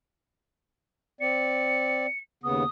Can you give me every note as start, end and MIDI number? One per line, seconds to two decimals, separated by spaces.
1.21 2.06 60
1.21 2.06 74
1.21 2.19 97
2.43 2.64 39
2.43 2.64 49
2.43 2.64 59
2.43 2.69 87